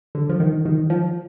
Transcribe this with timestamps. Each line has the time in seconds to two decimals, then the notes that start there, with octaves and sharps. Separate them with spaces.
0.15 D3
0.29 F3
0.40 D#3
0.65 D#3
0.90 F3